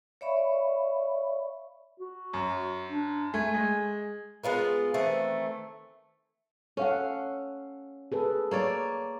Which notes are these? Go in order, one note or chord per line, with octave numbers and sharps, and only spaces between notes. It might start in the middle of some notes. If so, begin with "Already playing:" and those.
C#5 D5 E5 F5 B5 C#6
F#4
F#2
D4
A3 G#5
G#3
G#3 B3 F4 A#4
D#3 E3 A3 C4
C#4 A4 F5 F#5
G#4 A4 B4
A#3 C#5 D5